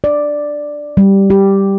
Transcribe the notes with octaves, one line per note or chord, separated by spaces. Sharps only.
D5
G3
G4